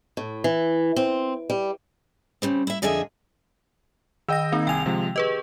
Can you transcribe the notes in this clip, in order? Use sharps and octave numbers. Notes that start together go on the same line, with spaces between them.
A2
E3
C4
G3
C#3 G3 C4
E4 E5
F2 D3 G#4 D#5 E5 G#5
D#3 D#5 G5 E6 A#6
D#3 A#3 C4 D#4
C2 G5 G#5 F7
C3 F3 G#3
G4 G#4 B4 D#5